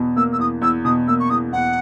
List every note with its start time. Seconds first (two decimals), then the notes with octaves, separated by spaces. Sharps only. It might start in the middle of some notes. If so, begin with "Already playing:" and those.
Already playing: E2 B2
0.16 A#3 E6
0.33 E6
0.39 E2 D#6
0.61 E2 E6
0.85 B2 D#6
1.07 A#3 E6
1.19 C#6
1.30 E2 D#6
1.53 E2 F#5